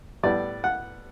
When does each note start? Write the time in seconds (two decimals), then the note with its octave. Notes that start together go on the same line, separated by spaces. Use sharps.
0.23 A2 G3 B3 D5
0.64 F#5